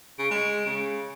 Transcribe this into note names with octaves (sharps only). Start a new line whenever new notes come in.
C#3 D7
G#3
C#3